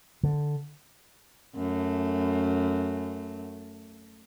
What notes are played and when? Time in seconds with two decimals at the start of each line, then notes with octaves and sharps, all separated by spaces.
0.23 D3
1.55 F#2 A3